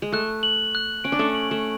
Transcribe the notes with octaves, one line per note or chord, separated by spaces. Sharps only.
G#3
A3 F#6
F#7
F#6
C#4 D7
D4
A3 C#4
F#7
A3